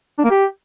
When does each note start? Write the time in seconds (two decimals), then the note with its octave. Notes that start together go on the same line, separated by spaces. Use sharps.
0.18 D4
0.24 A#3
0.30 G4